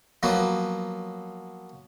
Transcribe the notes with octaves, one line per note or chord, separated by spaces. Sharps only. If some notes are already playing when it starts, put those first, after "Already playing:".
F3 F#3 A#3 B3